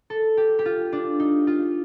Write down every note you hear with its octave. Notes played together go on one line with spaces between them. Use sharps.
A4
G4
G4
F4
D4
D#4
F4